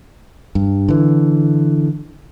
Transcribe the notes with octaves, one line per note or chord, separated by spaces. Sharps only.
G2
D3 E3